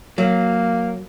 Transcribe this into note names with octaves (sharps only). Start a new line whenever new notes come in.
F#3 A#3